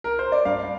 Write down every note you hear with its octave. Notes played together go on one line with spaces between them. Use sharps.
A#4
C5
D5
G2 F5